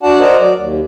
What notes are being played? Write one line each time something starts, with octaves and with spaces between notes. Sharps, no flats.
D4 F#4 D5 F#5 A5
A#4 C5 D5 D#5 F#5
F#3 D5
D#2